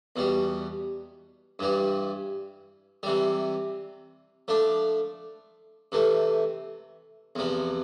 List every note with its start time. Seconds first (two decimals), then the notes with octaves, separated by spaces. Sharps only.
0.16 E2 B2 G3
1.59 G2 E3 G3
3.03 C3 E3 G3
4.48 F3 A3 D4
5.92 C3 E3 A3
7.35 E2 C3 F3